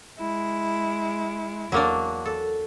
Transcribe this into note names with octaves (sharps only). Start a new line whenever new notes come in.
G#3 E4
E2 F#3 A#3 D4
A4